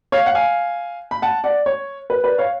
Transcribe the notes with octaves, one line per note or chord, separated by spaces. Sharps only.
C#5 F5
F#5
F5 G#5
B5
F#5 A5
D5 F#5
C#5
B4
B4 D5
C#5 F5